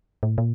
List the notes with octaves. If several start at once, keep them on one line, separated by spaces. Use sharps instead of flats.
A2
A#2